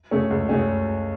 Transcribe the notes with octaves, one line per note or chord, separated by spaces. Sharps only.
C#3 A3 C#4
C#2
C#3 A3 C#4